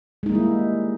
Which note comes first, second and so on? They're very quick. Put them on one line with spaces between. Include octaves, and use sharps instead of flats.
G#3 D#4 A#3 G3 E4